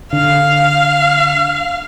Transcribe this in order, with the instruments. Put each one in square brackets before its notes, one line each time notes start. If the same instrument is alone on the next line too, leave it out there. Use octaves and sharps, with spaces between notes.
[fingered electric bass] D3 [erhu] F5